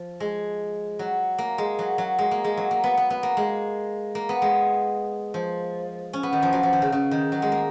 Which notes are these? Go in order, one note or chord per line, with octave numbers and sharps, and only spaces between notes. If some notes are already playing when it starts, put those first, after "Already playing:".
Already playing: F3
G#3
F#3
A#3
G#3
F#3
F#3
G#3
A#3
G#3
F#3
A#3
B3
B3
B3
A#3
G#3
A#3
B3
G#3
F3
C#4
B3
D#3
F3
F#3
F3
D#3
C#3
C#3
D#3
F#3
G#3
A#3